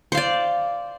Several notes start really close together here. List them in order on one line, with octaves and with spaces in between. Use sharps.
C5 F5 D5